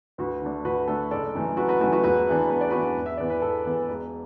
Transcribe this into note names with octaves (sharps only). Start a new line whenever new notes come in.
D2 F#4 B4
D3 A3 D4
D2 F#4 B4
D3 A3 D4 A4
F#1 A4 D5
F#2 E3 A3
F#1 F#4 B4
F#4 B4
F#2 E3 A3 F#4
F#4 B4
E1 F#4 B4
E2 E3 B3 D4
E1 B4
D5
E2 E3 B3 D4 F#4 B4
E1
E5
E2 E3 B3 D5
B4
E1 A4
E2 E3 B3
E1